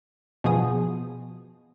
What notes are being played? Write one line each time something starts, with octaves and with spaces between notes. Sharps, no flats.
B2 F3 G#4 D#6